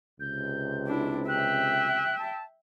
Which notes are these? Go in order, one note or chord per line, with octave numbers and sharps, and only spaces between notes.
C#2 C3 G6
D4 E4
E5 G5 F#6
A5